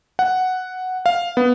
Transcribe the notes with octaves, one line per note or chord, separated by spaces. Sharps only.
F#5
F5
B3